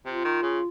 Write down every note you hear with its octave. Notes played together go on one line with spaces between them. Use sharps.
C3 F4
D#3
C#3